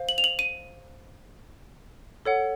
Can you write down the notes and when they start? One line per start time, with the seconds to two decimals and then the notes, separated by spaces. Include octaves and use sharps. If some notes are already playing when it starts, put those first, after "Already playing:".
Already playing: C5 F5
0.09 F#7
0.18 F7
0.24 F#7
0.39 D#7
2.25 A4 C#5 F#5